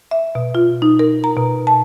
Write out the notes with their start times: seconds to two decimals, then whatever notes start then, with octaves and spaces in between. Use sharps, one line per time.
0.11 E5
0.35 B2
0.55 F4
0.82 D#4
0.99 A#4
1.24 A#5
1.36 B2
1.67 A5